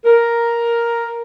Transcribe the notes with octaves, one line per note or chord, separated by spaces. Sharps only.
A#4